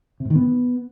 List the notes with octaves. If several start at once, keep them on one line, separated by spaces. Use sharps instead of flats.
C3
G#2
D#3
B3